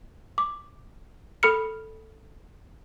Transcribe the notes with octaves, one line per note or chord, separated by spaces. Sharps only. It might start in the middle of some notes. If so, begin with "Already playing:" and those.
D6
A4 B5 F6 C#7